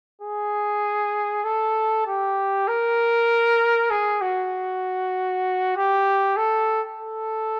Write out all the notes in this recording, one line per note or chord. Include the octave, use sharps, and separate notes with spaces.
G#4
A4
G4
A#4
G#4
F#4
G4
A4
A4